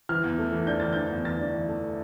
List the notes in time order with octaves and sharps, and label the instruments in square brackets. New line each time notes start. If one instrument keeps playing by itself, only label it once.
[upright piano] E3 F6
E2
A3
E3
D4 G6
E3 A6
D4 G6
E2
E3 A6
D4
E3
A3